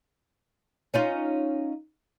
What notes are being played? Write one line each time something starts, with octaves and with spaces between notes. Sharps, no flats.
C#4 D#4 F4